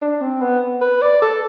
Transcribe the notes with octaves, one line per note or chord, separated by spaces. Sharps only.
D4
C4
B3
B4
D5
A4